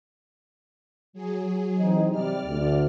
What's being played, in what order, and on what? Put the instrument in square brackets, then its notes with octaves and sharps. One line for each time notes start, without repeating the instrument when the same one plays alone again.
[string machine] F#3 G#4
[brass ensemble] E3 C4 D#4
[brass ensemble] C3 G3 [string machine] D5 F6
[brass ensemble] D2